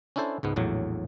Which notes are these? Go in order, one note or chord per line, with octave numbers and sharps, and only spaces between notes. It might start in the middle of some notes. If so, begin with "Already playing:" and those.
C#4 D4 E4 A4 C5
C#2 G#2 B3
A#1 E2 A2 F#3